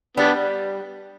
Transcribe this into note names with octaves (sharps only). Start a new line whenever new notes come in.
G3 B3 D4